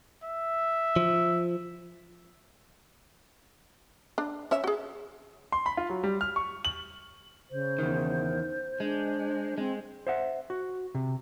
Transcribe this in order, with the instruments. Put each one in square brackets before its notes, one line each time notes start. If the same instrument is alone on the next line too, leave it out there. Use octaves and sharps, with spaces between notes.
[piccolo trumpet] E5
[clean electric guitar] F3
[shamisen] D4
C#4 C#5 E5
F#4 G#4
[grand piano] C6
B5
F4
F#3
G3
F6
C#6
F#7
[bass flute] C#3 [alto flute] C5
[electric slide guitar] E2 D#3
[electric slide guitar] G#3 [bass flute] D4
[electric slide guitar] G#3 [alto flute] C4
[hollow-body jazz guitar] C5 E5 F#5
F#4
C3